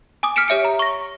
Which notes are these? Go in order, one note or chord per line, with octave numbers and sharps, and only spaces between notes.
G#5 D6 D#6
F6 B6 C#7 D7 E7
G4 C#5 E5 C#7 D7
A#5
C#6 A#6